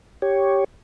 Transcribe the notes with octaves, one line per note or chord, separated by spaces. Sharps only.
G4 C#5